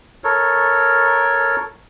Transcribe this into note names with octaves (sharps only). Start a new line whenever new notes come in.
A4 A#4 C#5